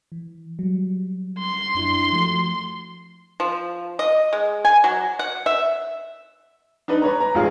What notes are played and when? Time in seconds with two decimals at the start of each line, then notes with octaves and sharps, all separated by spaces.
0.12 E3
0.59 F#3 G3
1.39 C6
1.75 F#2 D4 E4
2.13 F3 A3 F#4
3.40 F3
3.99 D#5
4.33 G#3
4.65 G#5
4.84 F#3
5.19 F#5
5.46 E5
6.88 D4 D#4 B4
7.02 B4 C#5 A#5
7.21 A#5
7.35 A1 F4 G#4